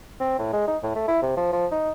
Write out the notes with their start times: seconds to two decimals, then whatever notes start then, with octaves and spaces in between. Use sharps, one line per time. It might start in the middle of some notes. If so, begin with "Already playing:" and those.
0.20 C4
0.39 A2
0.53 G#3
0.68 D#4
0.83 A2
0.95 A3
1.08 E4
1.22 C3
1.37 F3
1.53 F3
1.71 D#4